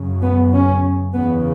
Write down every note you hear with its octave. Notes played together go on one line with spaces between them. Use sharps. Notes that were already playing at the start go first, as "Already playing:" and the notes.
Already playing: F#2 C#3
B3
C#4
E2 C#3 B3